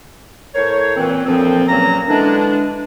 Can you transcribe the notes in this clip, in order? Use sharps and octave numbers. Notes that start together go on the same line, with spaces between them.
A2 A#4 C5 C#5
A#2 E3 C4
D2 A#2 F3 C4
C#2 A#2 F#3 A#3 C#4 A#5
D3 E3 G#3 D4